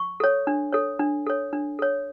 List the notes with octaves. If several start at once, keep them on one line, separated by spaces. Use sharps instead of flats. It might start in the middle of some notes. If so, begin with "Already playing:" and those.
Already playing: C#6
A4 C#5
D4
A4 C#5
D4
A4 C#5
D4
A4 C#5